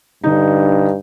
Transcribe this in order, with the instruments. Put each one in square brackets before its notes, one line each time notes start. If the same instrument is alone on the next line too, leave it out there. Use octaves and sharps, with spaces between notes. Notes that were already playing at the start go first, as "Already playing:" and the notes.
[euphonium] G2 [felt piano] D3 D#4